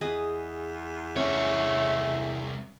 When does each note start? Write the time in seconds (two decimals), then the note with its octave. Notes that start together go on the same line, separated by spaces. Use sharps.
0.01 E2 G#4 B4 D#5
1.16 C2 A3 C#4 C#5